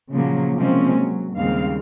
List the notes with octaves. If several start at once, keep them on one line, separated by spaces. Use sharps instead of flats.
A#2 C#3 F3 F#3 A#3
C3 F3 G#3 A#3 C4 C#4
F#3
D#2 G#2 C#3 G3 C4 F5